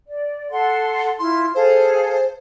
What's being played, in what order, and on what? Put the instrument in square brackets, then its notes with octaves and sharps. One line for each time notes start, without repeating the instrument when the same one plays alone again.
[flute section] D5
A4 F#5 C6
[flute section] E4 F4 [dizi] C6
[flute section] G#4 A4 F5 [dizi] C5